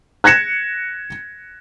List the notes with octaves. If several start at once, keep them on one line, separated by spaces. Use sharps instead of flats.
F#6 G#6 A#6 C#7 E7